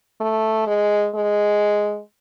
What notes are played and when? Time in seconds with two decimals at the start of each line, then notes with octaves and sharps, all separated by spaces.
0.21 A3
0.67 G#3
1.15 G#3